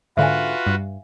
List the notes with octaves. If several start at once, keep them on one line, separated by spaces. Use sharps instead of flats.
G#2 D3 F4 F#4 B4 E5 F5 G#5
G2